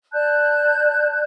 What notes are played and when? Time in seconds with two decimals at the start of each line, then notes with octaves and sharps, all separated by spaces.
0.13 D5 A5 F#6 G6